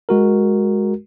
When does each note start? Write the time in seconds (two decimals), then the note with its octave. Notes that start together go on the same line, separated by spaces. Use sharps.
0.09 G#3 F#4 A#4